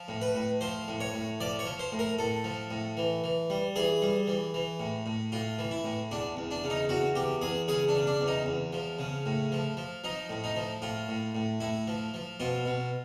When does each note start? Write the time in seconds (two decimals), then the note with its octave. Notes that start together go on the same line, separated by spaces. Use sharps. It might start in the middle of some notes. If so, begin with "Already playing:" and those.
Already playing: F3
0.08 A2
0.21 B4
0.35 A2
0.61 F3 C5
0.88 A2
1.00 C#5
1.14 A2
1.40 F3 D5
1.59 C#5
1.66 F3
1.79 C5
1.92 A2
1.99 A#4
2.18 A2 A4
2.44 F3
2.71 A2
2.97 E3
3.24 E3
3.50 G3
3.76 E3 G#4
4.02 G3
4.28 E3
4.54 E3
4.80 A2
5.06 A2
5.32 A2 F4
5.59 E3
5.71 E4
5.84 A2
6.11 E2 D4
6.37 E2
6.51 D4
6.64 C#3
6.70 D#4
6.89 E2 F#4
7.15 E2 G4
7.41 E2 G#4
7.68 C#3 G#4
7.89 D4
7.95 C#3
8.07 D4
8.21 E2
8.28 D#4
8.46 E2
8.73 F3
8.99 C#3
9.26 A2
9.52 F3
9.77 F3
10.04 F3 D#4
10.30 A2
10.44 D#4
10.56 F3
10.82 A2 F4
11.08 A2
11.35 A2
11.60 A2 E4
11.88 F3
12.14 F3
12.40 B2 F4
12.66 B2